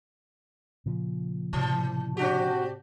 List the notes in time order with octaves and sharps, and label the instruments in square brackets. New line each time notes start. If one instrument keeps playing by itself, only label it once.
[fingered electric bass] A#2 C#3 F3
[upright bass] A2 C3 [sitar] E3
[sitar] C4 D4 G4 [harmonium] F#4